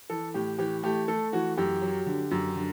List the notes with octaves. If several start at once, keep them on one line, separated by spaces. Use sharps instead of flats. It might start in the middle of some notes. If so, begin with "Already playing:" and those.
E3 A4
A2 G4
E3 G4
A3 G4
A3 A4
E3 F#4
F#2 G4
F#3
D3
F#2
D3